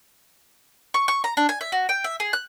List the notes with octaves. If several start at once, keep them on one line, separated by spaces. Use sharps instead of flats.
C#6
C#6
A#5
D4
G#5
E5
F#4
G5
E5
G#4
F#6